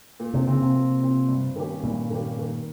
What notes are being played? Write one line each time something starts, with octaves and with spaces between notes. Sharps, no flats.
A#2
C3
C#3 F3 C4
C3
A#2
F3 C4
G2
D#3 A#3 C#4 G4
G2 A#2
D#3 A#3 C#4 G4
D#3